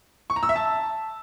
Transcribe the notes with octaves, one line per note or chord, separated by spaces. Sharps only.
C#6
A#5
E6
E5
A5